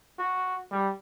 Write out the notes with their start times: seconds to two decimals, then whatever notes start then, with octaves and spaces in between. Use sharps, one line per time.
0.19 F#4
0.71 G3